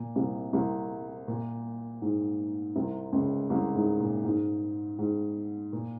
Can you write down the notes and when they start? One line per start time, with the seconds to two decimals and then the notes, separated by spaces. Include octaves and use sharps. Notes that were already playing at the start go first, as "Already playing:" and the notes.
Already playing: A#2
0.15 C2 C3
0.53 C2 C3
1.28 A#2
2.02 G#2
2.76 C2 C3
3.12 C#2 C#3
3.50 C2 C3
3.74 G#2
4.00 A#2
4.24 G#2
4.98 G#2
5.73 A#2